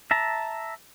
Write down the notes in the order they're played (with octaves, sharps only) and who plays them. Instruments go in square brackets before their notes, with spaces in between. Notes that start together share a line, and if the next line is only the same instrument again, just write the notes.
[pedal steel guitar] E5 A5 A#5